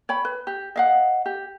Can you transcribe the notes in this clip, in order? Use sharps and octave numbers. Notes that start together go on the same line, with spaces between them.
C#5 G5 B5
B4
G4
D#5 F5 F#5
G4